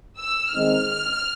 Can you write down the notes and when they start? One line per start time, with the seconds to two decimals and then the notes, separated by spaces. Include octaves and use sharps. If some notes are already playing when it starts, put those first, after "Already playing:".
0.21 E6
0.53 D#3 G#3 C4 D#4 F6